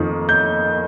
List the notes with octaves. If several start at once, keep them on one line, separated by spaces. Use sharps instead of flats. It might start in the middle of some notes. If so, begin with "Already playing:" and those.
Already playing: F2 D#3
G6